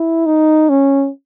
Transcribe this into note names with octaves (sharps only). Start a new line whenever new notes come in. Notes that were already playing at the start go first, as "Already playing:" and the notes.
Already playing: E4
D#4
C#4